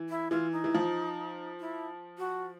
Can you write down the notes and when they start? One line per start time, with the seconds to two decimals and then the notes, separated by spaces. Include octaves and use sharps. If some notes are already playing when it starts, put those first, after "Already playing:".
Already playing: E3
0.09 E4
0.31 E3 F4
0.52 D#4
0.64 E3
0.74 F3
1.60 E4
2.18 F#4